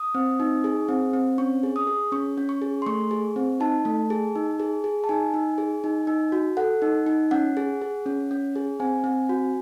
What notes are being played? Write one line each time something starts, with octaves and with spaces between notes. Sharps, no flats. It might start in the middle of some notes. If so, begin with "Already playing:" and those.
Already playing: D#6
C4
D#4
G#4
C4
C4
C#4 C#6
G#4
D#6
G#4
C#4 C#6
C#4
C#6
G#4
C6
A3 C#6
G#4
C4
D#4 A5
A3
G#4
D#4
G#4
G#4
A5
D#4 G#5
D#4
G#4
D#4
D#4
F#4
A4 F#5
D#4
D#4
C#4 F#5
G#4
G#4
C#4
C#4
G#4
C4 G#5
C4
F#4